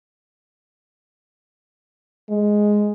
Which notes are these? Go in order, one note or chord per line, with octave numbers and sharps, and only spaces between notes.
G#3